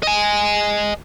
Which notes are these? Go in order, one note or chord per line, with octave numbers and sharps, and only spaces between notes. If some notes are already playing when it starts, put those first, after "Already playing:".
D#5 G#5